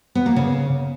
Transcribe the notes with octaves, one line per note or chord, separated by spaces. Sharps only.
B3
A#3
C#3